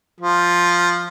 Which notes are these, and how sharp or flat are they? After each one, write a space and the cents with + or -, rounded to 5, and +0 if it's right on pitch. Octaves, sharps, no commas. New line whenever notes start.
F3 +0